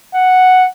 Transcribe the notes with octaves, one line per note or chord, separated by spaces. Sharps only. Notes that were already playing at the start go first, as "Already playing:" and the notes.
F#5